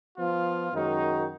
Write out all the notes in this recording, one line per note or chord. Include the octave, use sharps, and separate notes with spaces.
F3 B3 F4
F#2 D#3 G#3 D#4 F#4